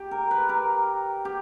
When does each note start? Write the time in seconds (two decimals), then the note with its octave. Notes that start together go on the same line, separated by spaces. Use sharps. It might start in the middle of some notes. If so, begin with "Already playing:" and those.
Already playing: G4
0.11 A#4
0.31 B4
0.49 A#4
1.25 G4